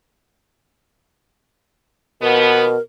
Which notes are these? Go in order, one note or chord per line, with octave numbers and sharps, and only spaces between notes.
D#2 B2 F3 B3 A#4